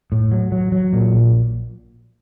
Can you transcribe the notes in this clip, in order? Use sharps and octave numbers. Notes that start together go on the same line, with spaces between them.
A2
F#3
F#3
F#3
A#2
A#1